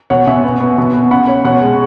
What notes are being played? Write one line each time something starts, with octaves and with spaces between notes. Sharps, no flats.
B2 C#5 F#5
B2 E5 G#5
B3
B3
B2
B3
C#3 F#5 B5
C#4 C#5
B2 C#5 F#5
G#3